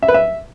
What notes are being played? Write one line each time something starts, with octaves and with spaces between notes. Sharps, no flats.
E5
B4
E5